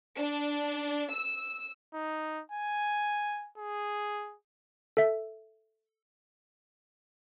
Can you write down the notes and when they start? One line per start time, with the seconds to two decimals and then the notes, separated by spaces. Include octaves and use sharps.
0.17 D4
1.12 E6
1.94 D#4
2.52 G#5
3.57 G#4
4.97 A4 E5